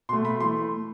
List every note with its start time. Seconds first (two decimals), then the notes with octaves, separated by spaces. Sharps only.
0.09 B2 C6
0.13 A3
0.25 B5
0.40 E3 A3 C6